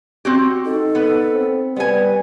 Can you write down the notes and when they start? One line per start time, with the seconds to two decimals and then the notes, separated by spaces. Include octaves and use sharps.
0.25 C4 F#4 G4
0.65 D#4 A4
0.95 B3 B4
1.32 C4
1.76 G3 B3 B4 G#5